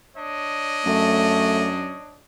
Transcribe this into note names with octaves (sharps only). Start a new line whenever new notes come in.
D4 C#5 D#5
F#2 A3